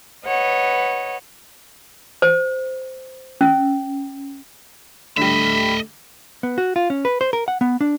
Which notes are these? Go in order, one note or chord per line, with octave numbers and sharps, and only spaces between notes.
B4 C#5 D#5 F#5
C5
C#4
D3 G3 A3 D#5 E5 B5
B3
F#4
F4
C#4
B4
C5
A#4
F#5
B3
D4